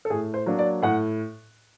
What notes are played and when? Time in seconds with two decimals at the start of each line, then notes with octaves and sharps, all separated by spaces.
0.05 A4
0.10 A2 G#4
0.34 C5
0.46 F#3 A#3 D4
0.59 D5
0.82 A2 F#5